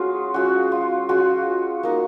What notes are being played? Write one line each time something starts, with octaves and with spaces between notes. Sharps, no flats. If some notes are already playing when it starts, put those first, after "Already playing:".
Already playing: G#3 C#4 F4 F#4 G#4
G#3 C#4 F4 F#4
F4
G#3 C#4 F4 F#4
A#3 D#4